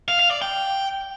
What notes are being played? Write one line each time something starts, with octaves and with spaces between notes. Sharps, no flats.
F5
F5
D5
G5